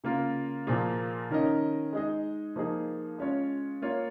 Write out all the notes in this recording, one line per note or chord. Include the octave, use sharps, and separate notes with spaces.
C#3 A#3 F4 A#4
A#2 F3 A#3 F4 G#4
D#3 C#4 A#4 D#5
G#3 D#4 G#4 D#5
F3 A#3 D#4 G#4
G#3 C#4 F4 C#5
A#3 F4 C#5